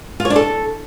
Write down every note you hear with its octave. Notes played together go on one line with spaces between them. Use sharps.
F4
C#5
D4
A4